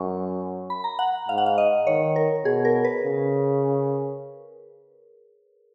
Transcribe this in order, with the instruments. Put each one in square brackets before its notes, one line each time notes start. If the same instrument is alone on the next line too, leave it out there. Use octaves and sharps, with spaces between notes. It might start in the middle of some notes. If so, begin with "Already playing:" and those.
Already playing: [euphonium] F#2 [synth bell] C#6
[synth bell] B5
A#5
F#5
[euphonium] G#2 [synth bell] F5
[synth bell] F#5
F5
D#5
[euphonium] D#3 [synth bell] C#5
[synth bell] A#4
[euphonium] B2 [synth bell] G#4
[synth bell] A#4
B4
[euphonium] C#3